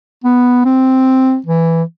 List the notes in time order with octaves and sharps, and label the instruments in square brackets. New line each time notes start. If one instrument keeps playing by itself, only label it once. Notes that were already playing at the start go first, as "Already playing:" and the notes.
[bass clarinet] B3
C4
E3